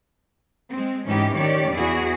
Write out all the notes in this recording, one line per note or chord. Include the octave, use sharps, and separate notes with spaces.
G#3 C4
G#2 E3 C#4 D#4 G4
D#3 C#4 G4 C#5 D5
E2 E4 F#4 G#4